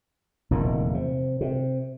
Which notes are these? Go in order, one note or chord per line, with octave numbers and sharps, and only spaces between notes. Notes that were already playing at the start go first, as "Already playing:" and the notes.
F1 E2 A#2 D#3
C3
C3